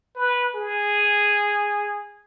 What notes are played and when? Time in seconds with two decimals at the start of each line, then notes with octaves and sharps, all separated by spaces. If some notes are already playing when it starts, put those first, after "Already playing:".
0.15 B4
0.55 G#4